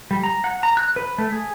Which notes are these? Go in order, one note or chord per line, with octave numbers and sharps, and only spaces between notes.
G3
A#5
F#5
A#5
F#6
B4
A3
G#4